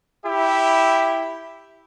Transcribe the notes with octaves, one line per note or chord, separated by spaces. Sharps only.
E4 G4 E5